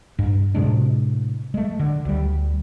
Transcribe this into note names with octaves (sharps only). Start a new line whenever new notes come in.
G2
A2 C3 G#3 D4
G#3 A3
D3
D2 G3